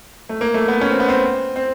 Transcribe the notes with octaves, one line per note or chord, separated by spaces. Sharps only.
A3
A#3
A3
B3
C#4
C4
B3
C4
C4